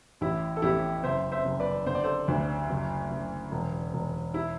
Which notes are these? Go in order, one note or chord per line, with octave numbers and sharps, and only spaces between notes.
A1 E4
A4
A1 E4 G4
F#1 C5 E5
C5 E5
F#1
B4 D5
D3 C5
D5
A4 C5
D2 D4
F#1
F#1
E1
E1
E4